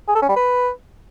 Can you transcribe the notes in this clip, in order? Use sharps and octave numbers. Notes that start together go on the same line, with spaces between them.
G#4
A4
C#4
G3
B4